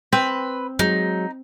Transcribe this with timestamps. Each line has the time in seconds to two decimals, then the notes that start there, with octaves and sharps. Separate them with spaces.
0.13 C4 B4
0.79 F#3 G#3 D#4